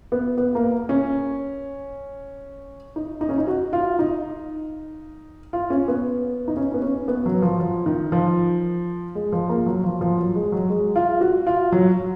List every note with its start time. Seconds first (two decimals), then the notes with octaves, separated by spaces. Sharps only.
0.12 B3
0.37 B3
0.55 A#3
0.89 C#4
2.96 D#4
3.21 D#4
3.29 C#4
3.38 D#4
3.47 F#4
3.73 F4
3.99 D#4
5.53 F4
5.70 C#4
5.88 B3
6.48 D#4
6.57 C#4
6.74 B3
6.82 C#4
7.08 B3
7.26 F#3
7.42 F3
7.60 F3
7.86 D#3
8.12 F3
9.15 G#3
9.32 F3
9.49 A#3
9.66 F#3
9.83 F3
10.01 F3
10.18 F#3
10.35 G#3
10.52 F#3
10.70 G#3
10.96 F4
11.21 F#4
11.47 F4
11.72 F#3